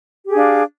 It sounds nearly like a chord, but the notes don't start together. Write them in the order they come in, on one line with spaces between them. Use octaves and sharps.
G4 G#4 D4 F5